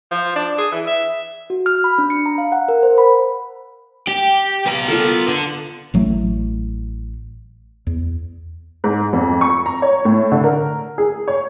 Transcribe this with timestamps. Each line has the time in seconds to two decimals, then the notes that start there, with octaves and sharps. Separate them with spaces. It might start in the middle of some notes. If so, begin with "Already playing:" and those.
0.11 F3
0.36 D4
0.59 G#4
0.72 E3
0.87 E5
1.50 F#4
1.66 F6
1.84 B5
1.98 D4
2.10 C#7
2.26 A#5
2.38 F5
2.52 F#5
2.68 A#4
2.83 C5
2.98 B5
4.07 G4
4.66 B3 A#5
4.88 F4 A4 A#4
5.28 D3
5.94 A1 F#3 A3
7.87 E2
8.84 G#2
9.13 F2
9.41 C#6
9.66 A#5
9.82 C#5
10.05 A2
10.32 D3
10.44 A#4
10.98 G#4
11.28 C#5